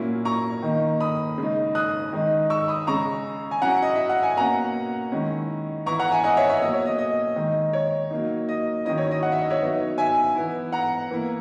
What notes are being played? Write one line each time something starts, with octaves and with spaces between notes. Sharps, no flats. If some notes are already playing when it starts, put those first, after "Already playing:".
Already playing: A#2 F#3 A#3 C#4 E4
A#5 C#6
D#3 A#3 D#4
B5 D#6
C#3 G#3 D#4
D#6 F#6
D#3 G#3 D#4
C#6 E6
B5 D#6
C#3 G#3 C#4 A#5 C#6
G#5
F#3 C#4 E4 F#5 A#5
D#5
E5
F#5
G#5
B2 A#3 C#4 F#5 A#5
D#3 G#3 C#4 E4
E3 B3 E4 A#5 C#6
F#5 A#5
E5 G#5
D#5 F#5
C#5 E5
C#5 E5
B2 F#3 A#3 D#5
C#5
D#5
D#5
D#3 G#3 D#4
C#5
F#3 A#3 D#4
D#5
D#3 F#3 C#4 E4 D#5
C#5
D#5
F#5
E5
D#5
C#5 E5
F#3 B3 D#4
E5 G#5
E3 B3 E4
F#5 A#5
E3 A#3 E4